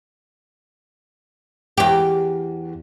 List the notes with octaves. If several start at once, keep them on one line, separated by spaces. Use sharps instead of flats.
E2 G4